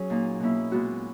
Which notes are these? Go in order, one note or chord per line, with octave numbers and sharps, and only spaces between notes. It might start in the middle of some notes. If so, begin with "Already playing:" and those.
Already playing: F#3 C#4 G#4
A#2 A#3 D#4
B2 A#3 C#4 E4
A#2 G#3 B3 F#4